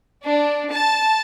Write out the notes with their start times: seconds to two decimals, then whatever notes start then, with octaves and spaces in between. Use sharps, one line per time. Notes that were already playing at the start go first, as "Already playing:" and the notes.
0.25 D4
0.71 A5